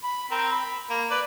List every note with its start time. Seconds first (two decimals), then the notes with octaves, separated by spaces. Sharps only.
0.03 B5
0.31 C4 A#4
0.52 B5
0.90 A#3
1.10 B4 D5